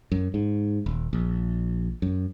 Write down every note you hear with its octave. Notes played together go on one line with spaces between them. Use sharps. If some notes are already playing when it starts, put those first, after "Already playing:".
F#2
G#2
D#1
A#1
F#2